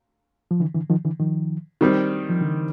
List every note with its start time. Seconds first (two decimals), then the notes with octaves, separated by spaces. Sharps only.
0.51 F3
0.60 D3 E3
0.75 D3 E3
0.90 D#3 F3
1.05 D3 E3
1.20 D#3 F3
1.81 D#3 G3 C4
2.30 F3
2.41 D3 E3